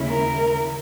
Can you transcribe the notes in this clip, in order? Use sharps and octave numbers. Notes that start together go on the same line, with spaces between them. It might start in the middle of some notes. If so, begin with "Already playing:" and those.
Already playing: D#2 C#3 G#3 C#4 E4
A#4